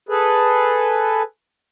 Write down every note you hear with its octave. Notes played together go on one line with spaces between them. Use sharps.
G#4 A4 B4